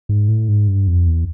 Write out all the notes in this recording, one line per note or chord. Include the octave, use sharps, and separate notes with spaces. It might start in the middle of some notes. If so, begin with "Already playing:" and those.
G#2
A2
G#2
G2
F2
E2